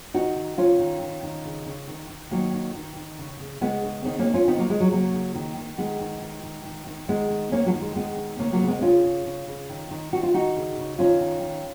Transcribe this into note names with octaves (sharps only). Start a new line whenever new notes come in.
D#3 D#4 F#4
D#3
D#3 C#4 F4
D#3
D#3
D#3
C#3
C#3
D#3
D#3
D#3 F#3 A#3
D#3
D#3
D#3
C#3
C#3
C#3 G#3 B3
C#3
D#3 B3 D#4
A#3 C#4
D#3
C#4 F4
D#3 B3 D#4
F#3 A#3
D#3 G#3
F#3
C#3 F#3 A#3
C#3
D#3
D#3
D#3 G#3 B3
D#3
D#3
D#3
D#3
D#3
D#3 G#3 B3
D#3
D#3 A#3 C#4
F#3 A#3
D#3
G#3
D#3 G#3 B3
D#3
C#3 A#3 C#4
F#3 A#3
C#3
G#3 B3
C#3 C#4 F4
C#3
C#3
C#3
D#3
D#3
D#3 F#4
F4
D#3 D#4 F#4
C#3
C#3
D#3 C#4 F4
D#3
D#3